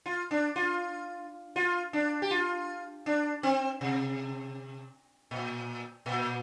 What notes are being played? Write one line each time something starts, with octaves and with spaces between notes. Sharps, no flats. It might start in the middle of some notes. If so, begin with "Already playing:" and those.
F4
D4
F4
F4
D4
G4
F4
D4
C4
C3
A#2
A#2